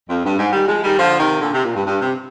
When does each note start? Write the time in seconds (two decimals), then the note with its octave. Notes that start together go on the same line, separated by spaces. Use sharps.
0.08 F2
0.24 G2
0.38 G#2
0.53 D#3 G3
0.68 F3 G#3
0.83 D#3 G3
0.98 D3 F3
1.19 C3 D#3
1.41 A#2 D3
1.53 C3
1.64 A#2
1.75 G2
1.86 G2
2.01 C3